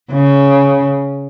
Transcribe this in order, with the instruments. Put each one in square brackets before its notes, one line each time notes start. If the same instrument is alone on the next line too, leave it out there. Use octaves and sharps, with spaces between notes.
[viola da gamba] C#3